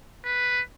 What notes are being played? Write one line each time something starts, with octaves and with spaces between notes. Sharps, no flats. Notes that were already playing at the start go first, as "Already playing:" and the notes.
B4